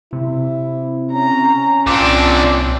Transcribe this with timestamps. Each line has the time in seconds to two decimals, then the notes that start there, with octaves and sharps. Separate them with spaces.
0.13 C3 E4
1.12 C#4 A#5
1.87 C2 A#2 C4 D4